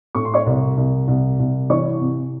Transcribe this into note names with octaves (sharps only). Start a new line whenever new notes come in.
A2 C#6
C6
C#5 C#6
C2
C2
C2
C2
E3 C#5 C#6
C3